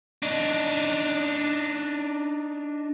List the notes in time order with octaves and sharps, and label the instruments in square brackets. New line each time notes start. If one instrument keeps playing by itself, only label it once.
[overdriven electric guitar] D4 D#4